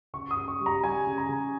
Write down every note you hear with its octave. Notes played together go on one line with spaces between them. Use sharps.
C#3 C#6
D#6
C#3
C#6
G3
A#5
G3 G#5
C#3
A#5
C#3